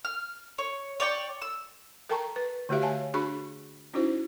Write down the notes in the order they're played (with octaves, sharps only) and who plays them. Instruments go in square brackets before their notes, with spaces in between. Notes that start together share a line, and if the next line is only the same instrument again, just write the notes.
[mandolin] F6
C#5
C#5 D5 G5 C#6
E6
[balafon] A4 A#4 G5 A5 A#5 C#6
B4
D3 A3 F#4 G4 E5 F5
C#5 F5 G#5 A5
D4 F#4 G#4 B5 C#6
C#4 D#4 E4 F#4 C5